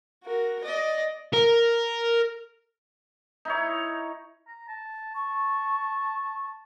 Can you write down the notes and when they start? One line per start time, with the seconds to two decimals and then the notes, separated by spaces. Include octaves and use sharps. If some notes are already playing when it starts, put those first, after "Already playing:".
0.24 F#4 A#4
0.64 D5 D#5
1.33 A#4
3.45 D#4 E4 C#5
4.47 A#5
4.68 A5
5.15 A5 C#6